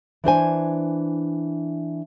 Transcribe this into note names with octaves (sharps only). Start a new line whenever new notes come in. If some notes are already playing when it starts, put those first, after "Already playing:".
E3 D4 C5 G#5